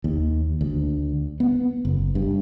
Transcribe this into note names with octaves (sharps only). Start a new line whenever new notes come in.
D#2
D2
B3
F#1
G2